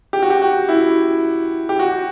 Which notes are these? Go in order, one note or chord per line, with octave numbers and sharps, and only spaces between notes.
G4
F#4
G4
F#4
E4
G4
F#4